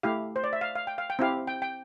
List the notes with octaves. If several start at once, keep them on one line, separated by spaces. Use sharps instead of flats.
A3 E4 G4 F5
C5
D5
E5
F5
F5
G5
F5
G5
C4 E4 G4 F5
G5
G5